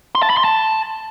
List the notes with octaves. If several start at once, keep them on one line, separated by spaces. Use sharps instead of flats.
C6
A5
B5
C6
A5